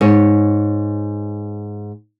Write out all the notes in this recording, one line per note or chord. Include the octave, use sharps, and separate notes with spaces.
G#2 C#5